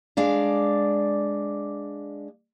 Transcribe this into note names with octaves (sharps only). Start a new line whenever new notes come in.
G#3 D4 D5 F5